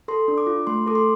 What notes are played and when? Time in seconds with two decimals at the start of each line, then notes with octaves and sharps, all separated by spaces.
0.08 A4 C6
0.28 D4
0.38 D6
0.47 F4
0.67 A3 C6
0.86 A4 D6
0.95 C6